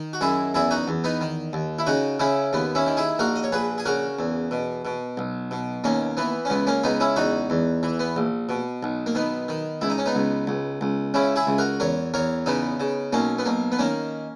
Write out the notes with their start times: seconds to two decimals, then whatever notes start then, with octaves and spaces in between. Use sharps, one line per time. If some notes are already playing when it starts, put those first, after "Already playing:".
Already playing: D#3
0.13 F#4
0.21 F#2 E4 G#4
0.54 E2 E4 G#4
0.71 D#4 F#4
0.88 E2
1.04 B3 D#4
1.21 D#3
1.53 D#2
1.79 E4
1.87 C#3 D#4 F#4
2.19 C#3 C#4 E4
2.53 D#2 B3
2.75 C#4 E4
2.86 D#3
2.97 E4 G#4
3.19 A#1 F#4 A#4
3.36 D#5
3.44 C#5
3.52 A#1 G#4 B4
3.78 G#4
3.85 C#3 F#4 A#4
4.19 E2
4.51 B2
4.85 B2
5.17 B1
5.51 B2
5.84 D#2 A#3 C#4
6.17 E3 B3
6.45 C#4
6.50 C#2 B3
6.67 A#3 C#4
6.84 C#2 B3 D#4
7.00 C#4 E4
7.16 E2 D#4 F#4
7.50 E2
7.83 E3
7.99 B3
8.16 A#1
8.49 B2
8.83 B1
9.06 A#3
9.15 D#3 B3
9.48 D#3
9.81 C#2 E4
9.90 D#4
9.98 C#4
10.06 B3 D#4
10.15 C#2
10.47 C#2
10.81 C#2
11.14 C#3 C#4 E4
11.36 E4 G#4
11.47 C#2
11.58 F#4 A#4
11.80 E2 A#4 C#5
12.14 E2 A#4 C#5
12.46 C#3 B3 D#4
12.80 C#3
13.13 B1 A#3 C#4
13.38 B3
13.45 B1 A#3
13.72 B3
13.79 D#3 A#3 C#4